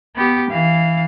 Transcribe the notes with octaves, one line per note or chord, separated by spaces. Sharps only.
B3 G4
E3 F5